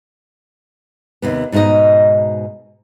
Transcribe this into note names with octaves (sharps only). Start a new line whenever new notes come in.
D#2 C3 B3
G#2 B2 D#4 A4 D#5